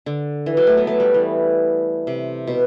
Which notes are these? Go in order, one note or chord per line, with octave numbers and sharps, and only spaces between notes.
D3
E3
F#3
A3
B3
A3
G3
E3
C3
B2